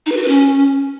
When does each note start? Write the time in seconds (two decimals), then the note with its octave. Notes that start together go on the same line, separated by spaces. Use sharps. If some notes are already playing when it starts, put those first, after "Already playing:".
0.06 D#4
0.12 B4
0.17 F#4
0.22 B4
0.28 C#4